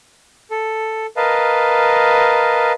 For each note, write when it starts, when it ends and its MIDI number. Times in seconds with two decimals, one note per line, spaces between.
0.51 1.06 69
1.17 2.73 70
1.17 2.73 71
1.17 2.73 75
1.17 2.73 77
1.17 2.73 81